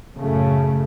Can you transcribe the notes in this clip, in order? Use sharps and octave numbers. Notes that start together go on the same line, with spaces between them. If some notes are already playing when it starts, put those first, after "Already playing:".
F#2 A2 C#3 A3